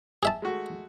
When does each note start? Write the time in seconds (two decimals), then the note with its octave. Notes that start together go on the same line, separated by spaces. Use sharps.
0.23 G#4 E5 A5
0.42 G#3 A3 F#4